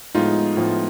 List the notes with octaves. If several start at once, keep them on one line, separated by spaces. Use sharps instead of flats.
A2 F3 G#3 B3 D#4 F4
A2 F3 G#3 B3